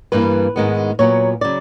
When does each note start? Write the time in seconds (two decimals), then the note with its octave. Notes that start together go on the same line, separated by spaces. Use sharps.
0.12 G2 E3 G3 A#3 B4
0.56 G#2 D#3 G#3 B3
0.99 A#2 F#3 B3 C#5
1.41 C#3 F#3 D5